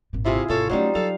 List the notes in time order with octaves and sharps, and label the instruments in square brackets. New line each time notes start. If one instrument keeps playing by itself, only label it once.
[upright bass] G#1 A#2
[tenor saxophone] C3 [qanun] E4 F4 G#4
[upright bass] G#1 C3 [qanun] F4 C#5 [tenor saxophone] A4
[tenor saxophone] F#3 [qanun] G3 D#4 C5 [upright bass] A3 C#4
[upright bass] F#3 [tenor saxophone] A4 [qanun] F5